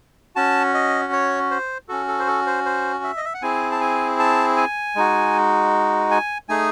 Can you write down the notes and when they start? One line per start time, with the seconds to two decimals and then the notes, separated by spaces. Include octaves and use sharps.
0.36 C#4 F#4 A5
0.74 D#5
1.12 C#5
1.51 C5
1.89 C#4 F#4 A4
2.08 A4
2.19 C5
2.27 A4
2.47 C5
2.66 C5
3.04 E5
3.17 D#5
3.25 E5
3.34 F#5
3.42 C4 E4 G#4 G#5
3.72 A5
3.81 G#5
4.19 A5
4.57 G#5
4.96 G#3 D#4 F#4
6.11 G#5
6.49 A3 D#4 G#4 G#5